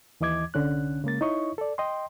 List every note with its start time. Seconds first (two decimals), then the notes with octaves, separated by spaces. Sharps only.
0.21 D#2 E3 D#5 D6 G#6
0.54 C2 D3 C#4 F#6
1.04 C#3 G#3 A#3 A6
1.21 D#4 E4 C#5 D#5 C#6
1.58 A4 D5
1.78 D#5 G5 C6